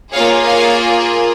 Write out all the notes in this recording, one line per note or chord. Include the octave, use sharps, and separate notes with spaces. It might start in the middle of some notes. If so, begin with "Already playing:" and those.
A#3 F4 G#4 C#5 F5
C#5 F5